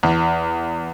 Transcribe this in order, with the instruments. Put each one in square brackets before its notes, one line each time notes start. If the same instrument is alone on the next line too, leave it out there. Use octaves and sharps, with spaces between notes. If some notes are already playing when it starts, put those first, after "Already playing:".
[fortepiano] E2